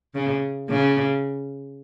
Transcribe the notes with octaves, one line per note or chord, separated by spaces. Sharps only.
C#3
C#3